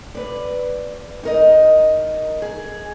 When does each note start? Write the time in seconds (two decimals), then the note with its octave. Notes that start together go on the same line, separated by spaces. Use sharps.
0.15 B4 D5
1.23 D#4 A#4 D#5
2.42 G#4